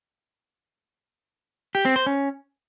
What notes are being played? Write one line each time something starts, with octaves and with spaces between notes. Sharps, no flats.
G4
C4
C5
C#4